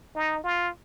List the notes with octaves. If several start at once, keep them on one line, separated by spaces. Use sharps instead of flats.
D#4
F4